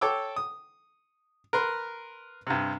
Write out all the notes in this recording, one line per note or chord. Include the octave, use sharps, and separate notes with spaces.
A4 C#5 G5 D6 E6
D#6
A#4 B4 C6
G2 C3